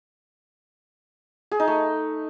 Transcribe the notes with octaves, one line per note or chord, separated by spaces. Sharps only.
G#4
D#4
A3